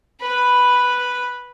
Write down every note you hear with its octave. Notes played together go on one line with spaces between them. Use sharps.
B4 B5